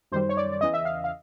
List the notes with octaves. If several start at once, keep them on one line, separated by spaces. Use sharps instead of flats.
F#2 D#3 G3 C5
C#5
D5
D5
E2 C#3 E3 D#5
E5
F5
F5